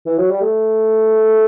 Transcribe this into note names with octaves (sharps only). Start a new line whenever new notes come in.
E3
F#3
G3
A3